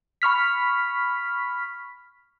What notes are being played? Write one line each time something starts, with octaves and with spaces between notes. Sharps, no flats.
B5 C#6 F6 B6